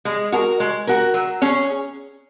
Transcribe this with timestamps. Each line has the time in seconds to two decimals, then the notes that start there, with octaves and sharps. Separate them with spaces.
0.05 G#3
0.32 F#4 A#4
0.60 G#3
0.87 F#4 A#4
1.14 F#3
1.42 C#4 G#4